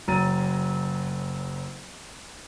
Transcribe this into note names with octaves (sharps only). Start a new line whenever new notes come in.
F#1 F#3 A#5 A6 D#7